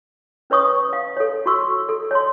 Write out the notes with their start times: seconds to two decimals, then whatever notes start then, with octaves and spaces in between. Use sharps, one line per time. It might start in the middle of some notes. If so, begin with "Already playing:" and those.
0.50 C#4 B4 C#5 C#6 D#6
0.93 F5
1.17 A4 C#5
1.46 F#4 C6 C#6 E6
1.89 A4
2.11 C#5 A5 C6